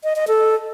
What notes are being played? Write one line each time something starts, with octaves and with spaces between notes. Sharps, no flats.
D#5
D#5
A4